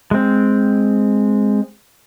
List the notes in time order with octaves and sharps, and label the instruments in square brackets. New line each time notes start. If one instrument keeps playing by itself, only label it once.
[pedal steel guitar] G#3 C4